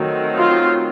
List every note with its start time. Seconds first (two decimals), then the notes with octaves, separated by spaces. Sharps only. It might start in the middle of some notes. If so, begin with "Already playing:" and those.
Already playing: D#3 F#3 A3 C4
0.37 F4